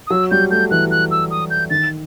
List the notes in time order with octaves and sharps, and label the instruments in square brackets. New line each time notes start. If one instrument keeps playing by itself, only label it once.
[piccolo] D#6
[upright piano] F#3 [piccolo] E6
[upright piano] G3 [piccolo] G6
[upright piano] A3 [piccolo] G6
[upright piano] E3 [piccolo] F#6
[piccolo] F#6
E6
D#6
G6
[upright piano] D#3 [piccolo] A6